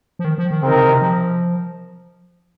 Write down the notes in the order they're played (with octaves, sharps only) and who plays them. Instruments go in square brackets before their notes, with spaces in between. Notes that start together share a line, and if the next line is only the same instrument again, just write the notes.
[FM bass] F3
D#3
F3
D#3
[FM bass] C#3 [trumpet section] C4 D#4 A#4
[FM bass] C3
C3
F3